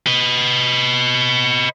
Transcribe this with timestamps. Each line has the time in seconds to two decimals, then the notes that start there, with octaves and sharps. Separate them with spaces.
0.07 B4 D#5